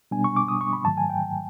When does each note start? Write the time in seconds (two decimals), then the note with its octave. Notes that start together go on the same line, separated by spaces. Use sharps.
0.11 B2 G3 B3 D4 G#5
0.24 C#6
0.36 D6
0.48 D#6
0.61 C#6
0.73 B5
0.85 G#2 D#3 F#3 A3 A5
0.98 G#5
1.10 G5